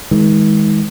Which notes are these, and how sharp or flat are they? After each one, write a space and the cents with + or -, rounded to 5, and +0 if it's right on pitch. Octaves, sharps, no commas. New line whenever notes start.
D#3 +45 G#3 +0